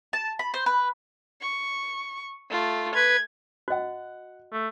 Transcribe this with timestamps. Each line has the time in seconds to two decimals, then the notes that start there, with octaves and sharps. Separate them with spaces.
0.13 A5
0.39 B5
0.54 C5
0.66 B4
1.41 C#6
2.50 A3 F4
2.95 B4 G#6
3.68 F#4 D#5 F#5 F#6
4.52 A3